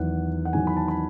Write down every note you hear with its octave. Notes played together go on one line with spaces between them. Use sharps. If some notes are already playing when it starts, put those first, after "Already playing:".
Already playing: E2 D#3 F#3 F#5
F#5
E2 D#3 F#3 G#5
B5
A5
B5